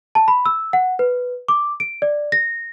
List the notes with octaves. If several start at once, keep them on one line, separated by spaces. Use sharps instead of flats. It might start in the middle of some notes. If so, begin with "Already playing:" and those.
A5
B5
E6
F#5
B4
D6
D7
D5
A#6